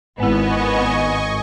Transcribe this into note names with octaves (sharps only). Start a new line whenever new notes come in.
G#1 G#3 B3 E4 D#5 G#5 C#6